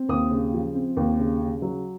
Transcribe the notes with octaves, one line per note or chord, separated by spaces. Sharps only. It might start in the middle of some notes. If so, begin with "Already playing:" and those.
Already playing: C4
D#2 D#6
C#3
F3
C4
D#2
C#3
C#3
F#3